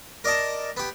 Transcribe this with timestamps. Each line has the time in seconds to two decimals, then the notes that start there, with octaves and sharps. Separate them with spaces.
0.24 A#4 D5 D#5 A5
0.77 B3 G4